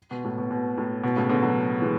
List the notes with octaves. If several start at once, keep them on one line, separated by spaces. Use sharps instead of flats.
B2
A2
B2
B2
A2
B2
A2 C#3
B2 D3
D3 F#3
E3 G#3